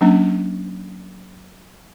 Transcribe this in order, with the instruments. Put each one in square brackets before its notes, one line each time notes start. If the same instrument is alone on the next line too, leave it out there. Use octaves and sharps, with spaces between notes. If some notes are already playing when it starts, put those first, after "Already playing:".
[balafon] F#3 A#3 C#4 D4